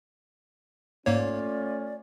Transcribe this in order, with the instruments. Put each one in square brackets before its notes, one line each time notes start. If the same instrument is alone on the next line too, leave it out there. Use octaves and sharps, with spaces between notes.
[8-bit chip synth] G#2 A#3 C#5 [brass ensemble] A3 C#4 F4 [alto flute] D5